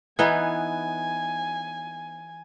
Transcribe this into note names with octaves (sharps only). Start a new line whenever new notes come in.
E3 B3 D#4 G#5